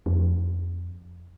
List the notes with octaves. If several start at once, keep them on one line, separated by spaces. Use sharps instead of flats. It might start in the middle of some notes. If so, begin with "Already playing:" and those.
F2